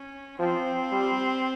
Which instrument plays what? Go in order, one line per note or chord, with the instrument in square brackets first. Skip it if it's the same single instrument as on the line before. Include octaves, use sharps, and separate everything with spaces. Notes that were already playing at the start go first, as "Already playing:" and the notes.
Already playing: [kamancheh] C#4
[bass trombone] F3 [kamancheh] C4
[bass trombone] G3